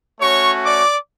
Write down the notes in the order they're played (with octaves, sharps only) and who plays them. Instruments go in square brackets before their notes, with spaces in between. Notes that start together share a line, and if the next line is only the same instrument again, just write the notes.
[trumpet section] A3 C#4 F#4 C#5 C#6
D5 D6